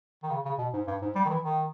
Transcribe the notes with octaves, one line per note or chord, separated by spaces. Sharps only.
D#3
C#3
C#3
B2
G#2
G2
G#2
G3
D#3
E3
D#3